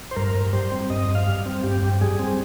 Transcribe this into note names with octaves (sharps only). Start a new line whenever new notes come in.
C5
G2 A#4
G2
G3 C5
C4
G2 D#5
G2
F5
G3
C4
G2 G4
G2
G3 G#4
C4